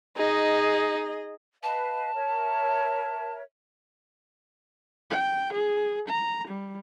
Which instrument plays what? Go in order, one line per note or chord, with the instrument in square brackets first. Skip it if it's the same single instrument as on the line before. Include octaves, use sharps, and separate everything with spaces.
[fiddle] D#4 [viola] G#4 D#5
[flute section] B4 D#5 F5 [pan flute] A5
[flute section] A#4 C#5 E5
[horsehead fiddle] G5
G#4
A#5
G3